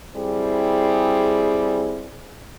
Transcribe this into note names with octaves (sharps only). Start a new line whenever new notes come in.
G3 C4 E4 G#4